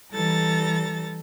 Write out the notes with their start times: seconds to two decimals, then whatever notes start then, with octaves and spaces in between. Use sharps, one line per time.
0.14 E3 G3 A4 A#5 A6